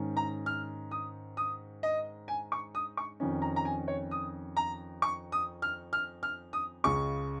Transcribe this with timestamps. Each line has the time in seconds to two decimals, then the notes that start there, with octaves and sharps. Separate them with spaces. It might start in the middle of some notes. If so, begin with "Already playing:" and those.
Already playing: G#2 D#3 C#4
0.17 A#5
0.46 F6
0.91 D#6
1.37 D#6
1.83 D#5
2.28 G#5
2.52 C#6
2.75 D#6
2.97 C#6
3.20 F2 D#3 C#4
3.42 A#5
3.56 A#5
3.65 G#5
3.88 C#5
4.11 D#6
4.57 A#5
5.02 C#6
5.32 D#6
5.62 F6
5.93 F6
6.23 F6
6.53 D#6
6.84 C#2 C#3 G#3 C#6